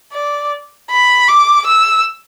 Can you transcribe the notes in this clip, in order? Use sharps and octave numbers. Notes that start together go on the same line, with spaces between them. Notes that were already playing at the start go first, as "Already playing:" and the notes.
D5
B5
D6
E6